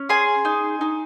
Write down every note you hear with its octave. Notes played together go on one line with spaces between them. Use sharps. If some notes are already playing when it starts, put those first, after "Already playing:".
Already playing: C#4
G#4 G#5 C6
D#4
D#4